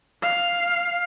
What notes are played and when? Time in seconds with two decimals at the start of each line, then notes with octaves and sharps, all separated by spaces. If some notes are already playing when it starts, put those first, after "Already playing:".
0.22 F5